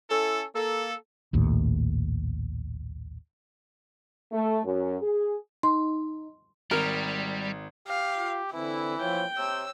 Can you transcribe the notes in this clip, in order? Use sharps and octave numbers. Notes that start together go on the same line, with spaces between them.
C#4 E4 A4
A#3 A4
A#1 D#2 A2
A3
F#2
G#4
D#4 C6
G#1 G3 A#4
G4 F5
F4
D3 E3 C4 E4
F3 F4 C#5 G5
C3 C#5 E6